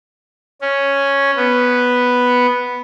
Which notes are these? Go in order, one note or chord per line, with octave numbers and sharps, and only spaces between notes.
C#4
B3